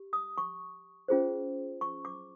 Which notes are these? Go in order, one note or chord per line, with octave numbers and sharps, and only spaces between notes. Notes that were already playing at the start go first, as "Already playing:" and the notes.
Already playing: G4
D#6
C#6
C#4 F4 G#4 C5
C#6
D6